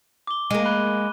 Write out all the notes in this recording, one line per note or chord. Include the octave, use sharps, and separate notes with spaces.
D6 G7
G#3 A#3 D#7
B5 F#6 G7